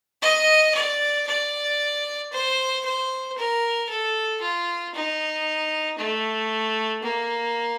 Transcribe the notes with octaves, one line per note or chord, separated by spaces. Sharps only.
D#5
D5
D5
C5
C5
A#4
A4
F4
D#4
A3
A#3